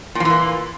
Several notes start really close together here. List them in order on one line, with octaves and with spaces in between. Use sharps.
A#2 F3 E3 A#3